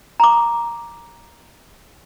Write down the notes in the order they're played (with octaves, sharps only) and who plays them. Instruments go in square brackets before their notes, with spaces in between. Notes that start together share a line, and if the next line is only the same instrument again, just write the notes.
[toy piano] A#5 D6